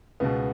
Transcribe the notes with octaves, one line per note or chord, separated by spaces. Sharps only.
C#2 B2 B3